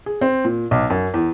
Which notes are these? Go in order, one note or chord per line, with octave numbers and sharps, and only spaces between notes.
G#4
C4
A#2
B1
F#2
E2